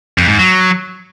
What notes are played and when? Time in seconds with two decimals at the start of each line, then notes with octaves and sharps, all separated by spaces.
0.18 F2
0.28 G#2
0.39 F#3